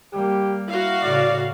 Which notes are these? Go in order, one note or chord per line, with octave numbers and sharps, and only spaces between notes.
G3 A#3 G4
E4 F#4 F5
A2 C#3 D5